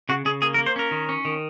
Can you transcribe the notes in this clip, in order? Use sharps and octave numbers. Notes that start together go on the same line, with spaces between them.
C#3 F#4
C#3 G#4
A#3 G#4
A#4
A#3
C5
C#4 A#4
D#3
C#4
D#3